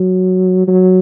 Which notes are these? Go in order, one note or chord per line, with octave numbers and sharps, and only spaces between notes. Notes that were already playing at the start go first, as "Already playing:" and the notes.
Already playing: F#3
F#3